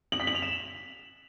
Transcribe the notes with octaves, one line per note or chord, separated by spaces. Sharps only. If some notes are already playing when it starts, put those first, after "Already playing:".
F#7
B6
F#7
F7
E7